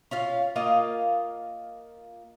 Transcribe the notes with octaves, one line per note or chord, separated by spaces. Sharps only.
C#4 F4 F5
A#3 F4 D#5 F5